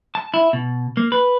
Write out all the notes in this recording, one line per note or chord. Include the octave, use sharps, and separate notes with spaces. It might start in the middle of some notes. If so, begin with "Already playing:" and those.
A5
E4
B2
A#3
B4